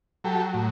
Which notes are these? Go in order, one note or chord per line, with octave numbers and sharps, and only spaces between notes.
F#3 G4 A4
A2